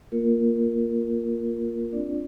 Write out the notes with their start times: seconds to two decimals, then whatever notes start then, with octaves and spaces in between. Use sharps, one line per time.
0.12 A#3 F4 A#4
0.57 A#3
1.02 F4
1.47 F4
1.93 C4 D4 D5